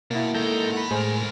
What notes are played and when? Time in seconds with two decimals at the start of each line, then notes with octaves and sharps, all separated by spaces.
0.11 B2 A#3 E4
0.34 G#2 D#3 A4 A#5 G6
0.73 F#5 B5
0.91 A2 G#3 G#4 A#4 C5